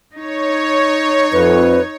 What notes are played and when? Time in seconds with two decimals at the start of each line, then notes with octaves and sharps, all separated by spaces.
0.15 D#4 C#5
1.32 F2 B4